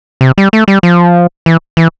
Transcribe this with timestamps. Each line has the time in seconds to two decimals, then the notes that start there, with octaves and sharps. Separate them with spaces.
0.21 C3
0.38 G3
0.53 A3
0.68 G3
0.83 F3
1.46 E3
1.77 E3